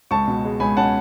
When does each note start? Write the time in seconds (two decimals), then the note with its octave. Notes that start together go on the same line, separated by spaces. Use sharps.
0.11 C#2 A5 C#6
0.27 B2
0.45 G#3
0.60 C#2 G#5 B5
0.76 C#4 F#5 A5